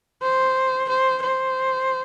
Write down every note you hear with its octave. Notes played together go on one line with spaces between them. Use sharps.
C5
C5
C5